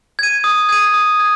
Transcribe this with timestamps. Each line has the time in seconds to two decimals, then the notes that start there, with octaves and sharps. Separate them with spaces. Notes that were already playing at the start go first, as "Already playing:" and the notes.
0.19 G#6 D#7
0.44 D#6
0.69 G#6 D#7
0.94 D#6
1.20 G#6